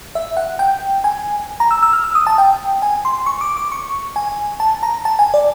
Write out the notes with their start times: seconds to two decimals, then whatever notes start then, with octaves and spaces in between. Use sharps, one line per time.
0.15 E5
0.37 F#5
0.59 G5
1.04 G#5
1.60 A#5
1.71 E6
1.83 E6
1.93 F6
2.04 E6
2.15 D#6
2.27 A5
2.38 G5
2.82 G#5
3.05 C6
3.26 C#6
3.41 D6
3.57 D6
3.72 C#6
4.16 G#5
4.60 A5
4.83 A#5
5.05 A5
5.19 G#5
5.34 D5